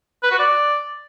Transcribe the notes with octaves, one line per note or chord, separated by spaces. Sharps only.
B4
F#4
D5